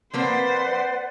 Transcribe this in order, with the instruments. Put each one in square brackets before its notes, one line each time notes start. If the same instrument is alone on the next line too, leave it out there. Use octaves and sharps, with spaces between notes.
[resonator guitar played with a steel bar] F3 A#3 C4 [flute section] B4 D5 F#5 [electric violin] C5